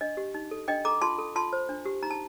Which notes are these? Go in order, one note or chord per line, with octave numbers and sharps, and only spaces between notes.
D4 D#5
G4
D#4
A4
D4 D#5 G5
A4 A#5 D6
F4 A5 C6
A4
F4 A5 C6
C5
D4
G4
D#4 A#5
A5